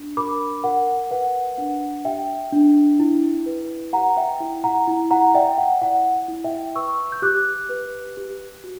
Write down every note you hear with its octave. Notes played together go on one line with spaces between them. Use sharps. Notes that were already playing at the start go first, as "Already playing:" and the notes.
Already playing: D4
A#4 B5 D6
A#4 F#5
B4 F#5
D4 F#5
G4 E5 G5
D4
E4
B4
G4 F#5 A#5
E5 G5
E4
F#5 A#5
E4
F#5 A#5
D5 E5 G5
F#5
E4 F#5
E4
E5 G5
B4 C#6 E6
G6
G4 D6 F#6
B4
G4
F#4